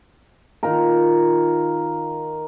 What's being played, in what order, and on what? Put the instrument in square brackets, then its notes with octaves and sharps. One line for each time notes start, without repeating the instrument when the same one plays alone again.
[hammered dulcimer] D#3 F4 A#4